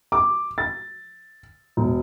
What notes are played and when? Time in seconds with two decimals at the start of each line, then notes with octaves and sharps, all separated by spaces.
0.12 D6
0.58 A6
1.77 E1